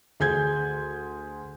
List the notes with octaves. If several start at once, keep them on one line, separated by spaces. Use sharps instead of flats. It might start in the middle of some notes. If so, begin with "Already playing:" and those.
D2 G#4 G6 G#6